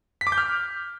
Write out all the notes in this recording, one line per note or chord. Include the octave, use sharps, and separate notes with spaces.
B6
D6
G6
F6